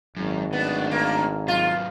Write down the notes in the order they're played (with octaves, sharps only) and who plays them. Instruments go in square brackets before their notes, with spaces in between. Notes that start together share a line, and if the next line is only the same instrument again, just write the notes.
[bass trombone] G#1 [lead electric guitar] F#2
[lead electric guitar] A2 D4 [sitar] B3
[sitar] A#3
[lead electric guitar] G#2 F#3 [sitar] F4